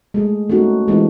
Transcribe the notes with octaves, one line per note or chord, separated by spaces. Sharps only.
G#3 A3 G#4
A3 A#3 C#4 D#4 F#4
E3 G#3 C4 D4 E4 F4